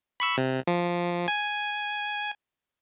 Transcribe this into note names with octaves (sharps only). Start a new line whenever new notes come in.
B5 C#6 E6
C3
F3
G#5